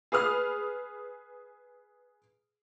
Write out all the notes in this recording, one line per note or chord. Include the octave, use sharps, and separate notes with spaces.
G#4 B4 D#6 F6